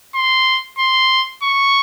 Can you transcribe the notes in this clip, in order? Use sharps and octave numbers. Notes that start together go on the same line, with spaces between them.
C6
C6
C#6